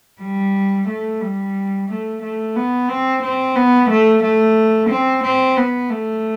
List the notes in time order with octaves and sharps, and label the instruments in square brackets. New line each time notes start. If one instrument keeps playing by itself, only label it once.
[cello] G3
A3
G3
A3
A3
B3
C4
C4
B3
A3
A3
C4
C4
B3
A3